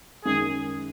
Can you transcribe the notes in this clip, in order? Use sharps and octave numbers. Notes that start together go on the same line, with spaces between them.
F#2 D#3 G#3 G#4